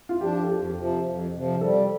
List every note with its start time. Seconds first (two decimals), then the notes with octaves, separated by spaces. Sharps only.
0.09 F4
0.21 F3 D4 G4
0.43 A4
0.49 F2 G4
0.77 C3 F3
1.05 F2
1.33 C3 F3
1.61 G3 A4